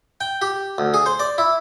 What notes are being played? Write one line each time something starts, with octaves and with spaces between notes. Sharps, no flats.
G5
G4
D2
G#4
C5
D5
E4